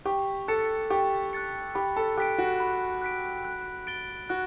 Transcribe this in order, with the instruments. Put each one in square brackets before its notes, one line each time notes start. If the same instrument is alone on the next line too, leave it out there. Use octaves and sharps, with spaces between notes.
[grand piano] G4 [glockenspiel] C#6
[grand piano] A4 [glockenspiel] F#6 A6 C#7
[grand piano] G4 [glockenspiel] C#6
[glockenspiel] F#6 A6 C#7
[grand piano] G4 [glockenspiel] B5
[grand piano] A4
[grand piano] G4 [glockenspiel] F#6 B6 D7
[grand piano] F#4
[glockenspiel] B5
F#6 B6 D7
F#6
A6 D7 G7
[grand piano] F#4 [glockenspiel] F#6